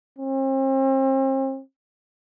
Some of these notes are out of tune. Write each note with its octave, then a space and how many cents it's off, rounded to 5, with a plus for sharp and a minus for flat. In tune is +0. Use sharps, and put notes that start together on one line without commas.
C4 +40